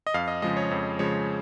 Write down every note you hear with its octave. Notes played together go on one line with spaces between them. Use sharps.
D#5
F2 F5
D#5
C#3 F3 G#3 D#5
C#5
F2
C#3 F3 G#3 C#5